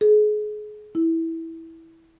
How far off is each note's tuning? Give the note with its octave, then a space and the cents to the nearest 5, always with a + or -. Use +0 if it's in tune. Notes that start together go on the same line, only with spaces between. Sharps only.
G#4 +30
E4 -10